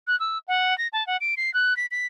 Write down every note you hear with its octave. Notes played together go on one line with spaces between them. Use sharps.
F#6
E6
F#5
A#6
A5
F#5
D7
C7
F#6
B6
B6